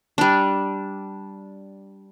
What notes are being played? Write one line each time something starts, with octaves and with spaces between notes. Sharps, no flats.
G3 D4